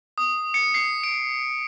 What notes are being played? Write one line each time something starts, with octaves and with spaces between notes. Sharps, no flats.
D#6
C#7
C7
D7